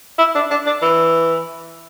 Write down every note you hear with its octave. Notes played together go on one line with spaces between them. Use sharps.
E4
D4
D4
D4
E3